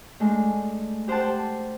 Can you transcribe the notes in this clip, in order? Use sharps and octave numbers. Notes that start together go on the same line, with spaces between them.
G#3 A3 D4
G4 C5 F#5 G5 A5